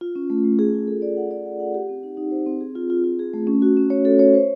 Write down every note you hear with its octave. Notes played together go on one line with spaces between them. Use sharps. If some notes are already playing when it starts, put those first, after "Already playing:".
F4
C#4
A3
A3
G#4
F4
A4
D5
F#5
D5
F#5
F#5
G4
C4
D#4
D#4
C5
C4
G#4
F4
F4
F4
G#4
A3
C#4
F#4
C#4
C#5
A4
C#5
C5